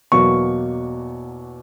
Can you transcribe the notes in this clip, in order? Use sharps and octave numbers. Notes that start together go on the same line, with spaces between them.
E2 B2 F#3 A#3 C#6